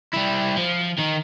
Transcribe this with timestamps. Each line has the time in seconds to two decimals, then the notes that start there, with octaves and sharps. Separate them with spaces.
0.14 G3 E4
0.58 F3
0.98 D#3 D#4